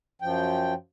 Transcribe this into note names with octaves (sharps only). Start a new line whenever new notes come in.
F#2 F3 G5